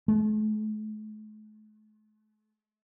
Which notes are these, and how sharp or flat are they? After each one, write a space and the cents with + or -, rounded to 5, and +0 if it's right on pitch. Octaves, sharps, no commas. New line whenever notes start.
A3 -45